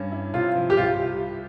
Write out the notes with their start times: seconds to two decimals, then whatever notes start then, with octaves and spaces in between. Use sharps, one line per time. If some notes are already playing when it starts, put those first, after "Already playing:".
Already playing: G2 G3 C#4
0.12 E4
0.34 C3 F4
0.55 F3
0.70 G4
0.76 C2 F4